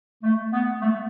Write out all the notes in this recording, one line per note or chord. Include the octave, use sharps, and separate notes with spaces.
A3
B3
A3